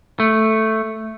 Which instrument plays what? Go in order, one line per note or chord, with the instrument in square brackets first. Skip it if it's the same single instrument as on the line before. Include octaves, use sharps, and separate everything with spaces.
[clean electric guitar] A3